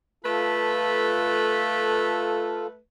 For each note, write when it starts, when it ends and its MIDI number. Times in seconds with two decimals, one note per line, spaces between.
0.24 2.78 57
0.24 2.67 65
0.24 2.67 69
0.24 2.78 71